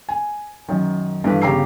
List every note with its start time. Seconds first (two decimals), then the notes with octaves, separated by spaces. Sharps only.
0.09 G#5
0.68 F#2 D#3
1.24 G2 E3 A4 B4 F5
1.42 G1 C#3 G4 A#5 E6 C7